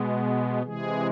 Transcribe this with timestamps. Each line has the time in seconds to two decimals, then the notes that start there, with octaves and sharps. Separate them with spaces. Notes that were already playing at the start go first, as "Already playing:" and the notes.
Already playing: B2 G#3 B3
0.62 C3 E3 G#3 G#4